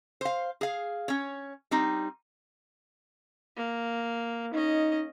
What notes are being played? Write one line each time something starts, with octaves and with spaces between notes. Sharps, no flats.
C5 F5
G#4 F5
C#4 C#5
G3 C4 D#4
A#3
C#4 D#4 D#5